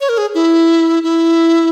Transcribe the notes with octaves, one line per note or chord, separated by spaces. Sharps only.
C#5
A#4
G#4
E4
E4